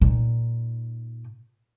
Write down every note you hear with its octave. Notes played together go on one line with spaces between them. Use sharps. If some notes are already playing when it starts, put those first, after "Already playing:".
A#2 D#4